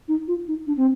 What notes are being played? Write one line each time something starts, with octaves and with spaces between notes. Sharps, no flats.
D#4
F4
D#4
D4
C4